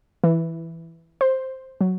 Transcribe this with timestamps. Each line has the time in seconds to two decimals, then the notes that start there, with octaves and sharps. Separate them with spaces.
0.24 E3
1.21 C5
1.81 F#3